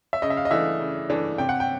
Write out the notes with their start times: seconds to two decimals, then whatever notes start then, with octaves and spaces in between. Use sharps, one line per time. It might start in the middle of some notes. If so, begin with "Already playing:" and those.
0.13 E5
0.22 C#3 D#5
0.30 E5
0.37 F5
0.45 D#5
0.51 E3 A3 D4 E5
0.80 C#3
1.10 E3 A3 D4
1.38 C3 G5
1.49 F#5
1.60 G5